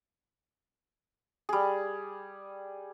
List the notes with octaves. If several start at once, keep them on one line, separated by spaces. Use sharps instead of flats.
G3 G#4